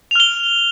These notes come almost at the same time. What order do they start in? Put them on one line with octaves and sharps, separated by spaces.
F7 F6 G7